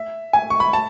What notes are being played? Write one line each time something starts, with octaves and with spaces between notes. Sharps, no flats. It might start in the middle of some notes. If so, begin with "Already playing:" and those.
Already playing: E5
G#5
C#6
B5
A5